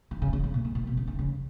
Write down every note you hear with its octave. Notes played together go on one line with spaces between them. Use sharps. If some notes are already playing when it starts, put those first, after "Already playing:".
D#3
C#3
C#3
C#3
A#2
G#2
A#2
B2
C#3
D#3
C#3